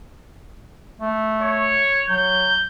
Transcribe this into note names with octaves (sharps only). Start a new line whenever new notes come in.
A3
C#5
F#3 G6